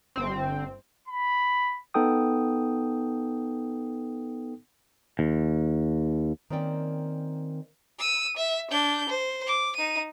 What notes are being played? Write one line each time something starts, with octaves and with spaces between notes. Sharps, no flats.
G1 C4
B5
B3 D#4 A4 G5 D#6
D#2
D#3 A#3 C4 C#4 D5 G5
E6 D#7
E5
D4 G6
C5
D6
D#4 D#7